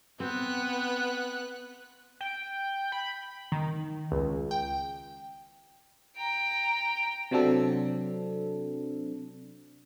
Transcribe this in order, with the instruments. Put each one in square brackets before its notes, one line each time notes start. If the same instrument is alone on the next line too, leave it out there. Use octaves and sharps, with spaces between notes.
[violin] B3 F#6 [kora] C4
[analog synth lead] G5
B5
[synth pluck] D#3
C#2
G5
[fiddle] G5 A#5
[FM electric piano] C3 F#3 C4 D4 A4